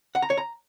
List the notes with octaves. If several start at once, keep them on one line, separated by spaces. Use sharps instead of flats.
F#5
A#5
C#5
A#5